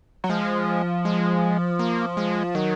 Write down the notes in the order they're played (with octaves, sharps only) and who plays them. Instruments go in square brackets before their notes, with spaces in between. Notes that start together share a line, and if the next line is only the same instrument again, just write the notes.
[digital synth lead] F#3
[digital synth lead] F3 [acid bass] G#3
[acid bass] G#3
A#3
G#3
[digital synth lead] D#3 [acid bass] F#3